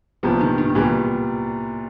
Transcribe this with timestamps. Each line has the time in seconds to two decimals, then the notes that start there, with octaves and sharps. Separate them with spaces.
0.23 C2 A#2 F3 G3 B3
0.41 D#3
0.58 D#3
0.69 D#3
0.75 C2 A#2 E3 G3 B3